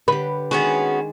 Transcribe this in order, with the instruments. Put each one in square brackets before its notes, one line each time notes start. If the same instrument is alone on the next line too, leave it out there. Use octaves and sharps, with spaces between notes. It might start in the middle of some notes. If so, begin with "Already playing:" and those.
[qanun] D3 G4 [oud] B4
[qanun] D#3 G#3 D4 [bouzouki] B3 C#4 F#4 [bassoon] G#4